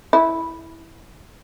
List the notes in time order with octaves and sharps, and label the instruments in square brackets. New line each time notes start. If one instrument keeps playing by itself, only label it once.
[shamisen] E4